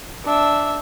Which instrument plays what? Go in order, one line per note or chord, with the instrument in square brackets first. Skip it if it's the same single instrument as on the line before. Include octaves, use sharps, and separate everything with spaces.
[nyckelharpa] D4 E5